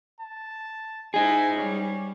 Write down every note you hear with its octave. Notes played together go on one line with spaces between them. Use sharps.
A5
D#4 E4 G#4 D#5 G#5
G3 C#4